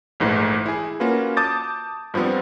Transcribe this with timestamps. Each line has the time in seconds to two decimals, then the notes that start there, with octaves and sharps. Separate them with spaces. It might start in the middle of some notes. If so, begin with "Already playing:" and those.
0.20 A#1 G#2 E3 A3
0.66 E4 G#4
1.00 A#3 C#4 F4 F#4 B4
1.37 A5 D6 D#6 G6 A6
2.14 G2 F3 G3 B3 C4